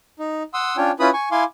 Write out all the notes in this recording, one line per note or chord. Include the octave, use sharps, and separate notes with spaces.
D#4
F#5 C6 D#6 E6
C#4 D4 F4 C#5 G5
C#4 E4 F4 B4 B5 D#6
G#5 C#6
E4 F5 G#5 C6 D6